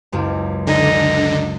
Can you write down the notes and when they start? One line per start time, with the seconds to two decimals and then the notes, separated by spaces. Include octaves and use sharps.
0.12 F#1 C#2 F#2
0.67 D3 D#4 G#5